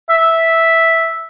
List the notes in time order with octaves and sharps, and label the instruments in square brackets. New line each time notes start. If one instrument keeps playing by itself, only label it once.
[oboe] E5